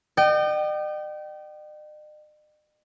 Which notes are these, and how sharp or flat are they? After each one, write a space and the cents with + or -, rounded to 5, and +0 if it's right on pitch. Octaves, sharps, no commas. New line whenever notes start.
D#5 -45 G5 -30